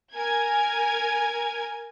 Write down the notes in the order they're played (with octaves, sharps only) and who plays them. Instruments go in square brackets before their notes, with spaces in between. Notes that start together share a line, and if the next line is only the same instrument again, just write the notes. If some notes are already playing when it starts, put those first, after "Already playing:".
[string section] A#4 G#5 G#6